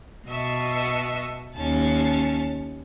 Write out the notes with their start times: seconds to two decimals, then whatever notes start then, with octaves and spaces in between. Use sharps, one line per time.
0.28 B2 D#5 E5 A5 C#6
1.55 D#2 C#4 A5